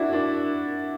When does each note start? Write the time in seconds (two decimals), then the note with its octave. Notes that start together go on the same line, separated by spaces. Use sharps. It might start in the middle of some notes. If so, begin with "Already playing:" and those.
Already playing: D4 E4 F#4
0.13 D4